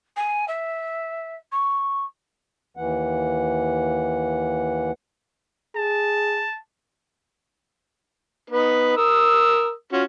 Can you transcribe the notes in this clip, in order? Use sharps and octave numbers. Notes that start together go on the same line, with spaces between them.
G#5
E5
C#6
D#2 E3 F#5
G#4 A5
B3 D#4 B4
A#4 D#6 E6
C#4 F4 F#4